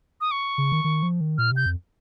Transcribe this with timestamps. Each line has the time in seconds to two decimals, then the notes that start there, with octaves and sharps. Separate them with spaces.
0.21 D#6
0.31 C#6
0.58 C#3
0.72 D#3
0.84 D#3
1.03 F3
1.21 D#3
1.38 A#2 F6
1.52 C3 G6
1.66 F2